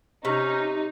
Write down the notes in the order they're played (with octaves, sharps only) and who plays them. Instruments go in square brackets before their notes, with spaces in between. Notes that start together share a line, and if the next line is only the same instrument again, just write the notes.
[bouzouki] C3 [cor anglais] C#4 [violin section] D#4